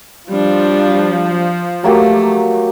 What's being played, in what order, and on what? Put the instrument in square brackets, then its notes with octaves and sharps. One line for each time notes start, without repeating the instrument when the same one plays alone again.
[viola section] F3 [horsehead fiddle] G3 D4
[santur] F#3 A#3 G4 [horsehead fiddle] A3